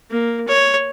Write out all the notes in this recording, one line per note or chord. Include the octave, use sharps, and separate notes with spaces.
A#3
C#5